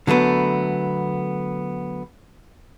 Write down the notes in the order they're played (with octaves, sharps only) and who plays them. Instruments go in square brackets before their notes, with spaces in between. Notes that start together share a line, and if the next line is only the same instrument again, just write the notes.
[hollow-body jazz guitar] D3 F#3 A3 B3